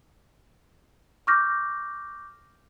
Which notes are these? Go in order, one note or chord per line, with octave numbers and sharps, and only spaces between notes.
C#6 D6 F6 G6 A#6